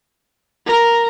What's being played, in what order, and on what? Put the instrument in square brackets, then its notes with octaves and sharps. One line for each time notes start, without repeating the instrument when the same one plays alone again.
[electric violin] A#4